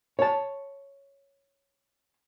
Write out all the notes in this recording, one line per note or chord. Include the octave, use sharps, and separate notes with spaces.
C#5 A5